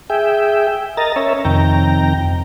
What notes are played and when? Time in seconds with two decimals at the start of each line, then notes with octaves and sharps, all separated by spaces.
0.10 G#4 E5 G5
0.97 A#4 D#5 A#5 A6
1.16 C#4 A#4 C#5 E5
1.45 F2 C3 D#3 G5 A#5